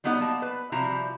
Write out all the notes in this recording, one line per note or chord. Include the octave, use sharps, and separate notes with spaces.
F#3 G3 B3 D#4 F#4 F#5
A#3 A5
B4
C3 F3 G3 E4 F#4 A#5